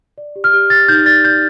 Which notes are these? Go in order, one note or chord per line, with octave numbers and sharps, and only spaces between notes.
D5
G4
F6
G4
G4 A6
D#4 G6
D5 A6
D5 G6